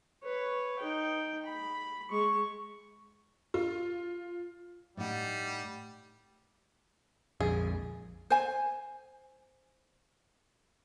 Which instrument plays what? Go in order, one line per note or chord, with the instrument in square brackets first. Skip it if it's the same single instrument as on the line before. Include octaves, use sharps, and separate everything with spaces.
[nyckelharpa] B4 C#5
D#4 G5
B5
G#3 C#6
[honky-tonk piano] F4
[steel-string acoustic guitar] A2 D#4 F#5 [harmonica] G3
[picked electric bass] A#1 F2 [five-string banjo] G#4
[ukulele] C5 G#5